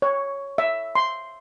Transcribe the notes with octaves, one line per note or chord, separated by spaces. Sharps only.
C#5
E5
C6